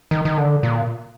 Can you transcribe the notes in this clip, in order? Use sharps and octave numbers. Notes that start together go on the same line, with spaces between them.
D#3
D#3
D3
A#2